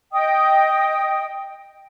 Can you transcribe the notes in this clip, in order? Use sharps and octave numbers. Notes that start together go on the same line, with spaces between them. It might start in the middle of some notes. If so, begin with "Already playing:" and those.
D#5 G5 D#6